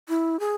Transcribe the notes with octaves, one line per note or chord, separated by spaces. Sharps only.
E4
G#4